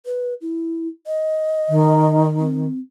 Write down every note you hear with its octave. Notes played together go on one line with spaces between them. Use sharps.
B4
E4
D#5
D#3
C4